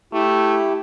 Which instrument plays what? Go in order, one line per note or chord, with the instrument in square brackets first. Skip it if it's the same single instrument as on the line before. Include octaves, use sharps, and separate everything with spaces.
[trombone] A3 [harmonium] E4 G4